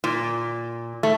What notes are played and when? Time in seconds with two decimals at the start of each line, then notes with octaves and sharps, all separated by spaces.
0.04 A#2
1.03 A3